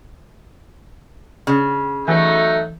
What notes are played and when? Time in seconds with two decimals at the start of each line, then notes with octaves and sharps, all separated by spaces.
1.47 C#3
2.08 E3 F#3 A3 D#4